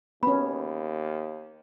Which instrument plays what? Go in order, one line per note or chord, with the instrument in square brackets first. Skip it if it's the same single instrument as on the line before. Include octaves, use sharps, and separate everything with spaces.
[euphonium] D#2 [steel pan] B3 C#4 [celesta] B5